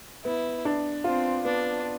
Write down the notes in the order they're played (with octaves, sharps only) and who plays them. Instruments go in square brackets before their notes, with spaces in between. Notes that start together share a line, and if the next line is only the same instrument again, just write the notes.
[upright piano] B3 [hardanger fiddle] E4
[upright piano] D4
[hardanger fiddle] C4 [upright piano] F4
[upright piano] B3 [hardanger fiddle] D4